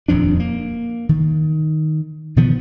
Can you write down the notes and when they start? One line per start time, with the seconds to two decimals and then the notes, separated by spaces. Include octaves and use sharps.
0.08 D#1 F2 F3 D4
0.40 A#3
1.09 D#3
2.36 B2 D#3 F3 B3